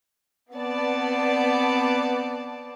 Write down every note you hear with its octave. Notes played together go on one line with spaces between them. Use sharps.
B3 C4 D5 A5